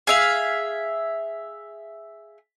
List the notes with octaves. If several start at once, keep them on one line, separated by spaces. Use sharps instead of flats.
G#4 E5 F5